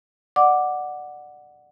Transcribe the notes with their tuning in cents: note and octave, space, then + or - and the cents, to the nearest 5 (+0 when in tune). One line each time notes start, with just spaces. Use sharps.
D5 +25 F#5 +0 D6 +0